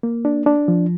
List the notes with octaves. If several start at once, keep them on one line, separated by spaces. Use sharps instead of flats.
A#3
D4
D4
F3